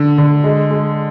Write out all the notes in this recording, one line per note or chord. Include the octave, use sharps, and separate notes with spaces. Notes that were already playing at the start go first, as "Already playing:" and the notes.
Already playing: D3
D3
G#3
G#3